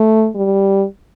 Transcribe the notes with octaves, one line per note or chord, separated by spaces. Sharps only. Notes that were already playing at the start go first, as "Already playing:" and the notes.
Already playing: A3
G3